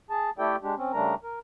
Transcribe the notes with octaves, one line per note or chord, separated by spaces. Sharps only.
G#4 A5
A3 E4 G4 A4 D5 G5
G#3 D4 G4
C4 C#4
C#3 G3 A3 D4 A#4 A#5
A#4